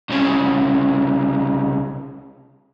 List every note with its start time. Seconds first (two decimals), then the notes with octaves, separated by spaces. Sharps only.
0.10 C2 C#3